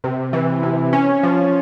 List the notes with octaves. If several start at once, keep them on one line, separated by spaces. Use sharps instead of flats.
C3
E3
C3
C#4
F3